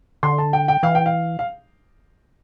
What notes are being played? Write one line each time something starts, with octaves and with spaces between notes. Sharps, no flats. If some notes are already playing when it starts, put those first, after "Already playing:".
D3 C6
A5
G5
G5
E3 F5
G5
F5
F5